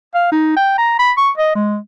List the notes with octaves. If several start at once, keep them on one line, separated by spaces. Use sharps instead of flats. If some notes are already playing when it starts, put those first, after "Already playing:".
F5
D#4
G5
A#5
B5
C#6
D#5
G#3